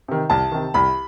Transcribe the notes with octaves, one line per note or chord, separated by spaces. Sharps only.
C3 D#3
C2 A5
C3 D#3
C2 B5